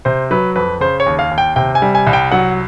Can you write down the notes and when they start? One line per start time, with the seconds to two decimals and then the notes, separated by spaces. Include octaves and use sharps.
0.05 C3 C5
0.31 F#3 B4
0.56 F2 B4
0.81 C#3 C5
1.00 C#5
1.06 D#2
1.19 F5
1.31 D#2
1.38 G5
1.56 C3 G5
1.75 G#5
1.82 G3
1.95 G#5
2.07 C2
2.13 G5
2.31 F#3 F#5